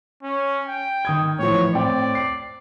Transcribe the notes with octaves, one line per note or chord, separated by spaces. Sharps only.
C#4
G5
D#3 D#6 G#6
A2 E3 F3 C#5
A2 C4 D5 G5
C7